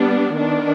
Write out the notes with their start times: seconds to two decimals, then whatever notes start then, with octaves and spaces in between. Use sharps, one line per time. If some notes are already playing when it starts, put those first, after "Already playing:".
Already playing: G3 B3 D4
0.36 D#3 B3 D4